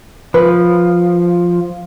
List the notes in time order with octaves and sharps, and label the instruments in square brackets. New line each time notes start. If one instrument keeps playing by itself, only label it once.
[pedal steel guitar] F3 [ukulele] B4